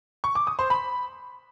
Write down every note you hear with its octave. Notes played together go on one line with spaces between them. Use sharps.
C#6
D6
D#6
C5
B5